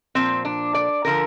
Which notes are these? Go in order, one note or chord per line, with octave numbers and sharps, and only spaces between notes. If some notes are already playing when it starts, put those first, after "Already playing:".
A#2 F3 C4
D4
D5
D3 F3 A#4